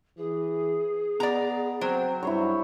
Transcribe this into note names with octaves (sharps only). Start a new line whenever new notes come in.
E3 G#4
B3 D5 A#5
F#3 C4 C5
G2 E4 C5 C#5